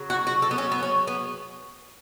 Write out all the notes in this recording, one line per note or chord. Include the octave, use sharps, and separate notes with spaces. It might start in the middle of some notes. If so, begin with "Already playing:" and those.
Already playing: C#3 F#3
F#4
F#4
A4
B3
C#4
B3
C#4
B3